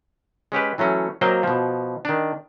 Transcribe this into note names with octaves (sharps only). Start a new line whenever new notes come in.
G#3 C#4 G4 B4
E3 F#3 A3 C#4
F#3 A#3 C4 C5 D#5 F5
B2 F3
D#3 D4